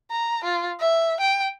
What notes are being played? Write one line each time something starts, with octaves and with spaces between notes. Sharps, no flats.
A#5
F4
E5
G5